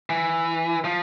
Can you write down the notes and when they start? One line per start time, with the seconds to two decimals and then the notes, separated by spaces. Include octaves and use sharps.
0.10 E3
0.85 F3